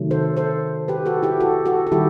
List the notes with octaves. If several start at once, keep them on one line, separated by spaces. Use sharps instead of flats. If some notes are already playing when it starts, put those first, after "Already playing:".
Already playing: C3 D#3 F#3 A3
A4 C5
A4 C5
G4 B4
F#4 A4
E4 G4
F#4 A4
F#4 A4
A4
D#3 G3 E4 G4